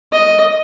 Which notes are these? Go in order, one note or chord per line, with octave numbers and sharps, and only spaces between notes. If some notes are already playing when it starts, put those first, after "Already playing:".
D#5